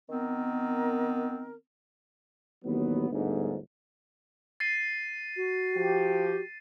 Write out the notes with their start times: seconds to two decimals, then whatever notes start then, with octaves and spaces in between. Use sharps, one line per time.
0.09 D#3 B3 C4 A#4
2.65 A1 D#2 F#3 B3
3.11 G1 D2 G#2
4.60 A6 C7 D#7
5.37 F#4
5.75 F3 G4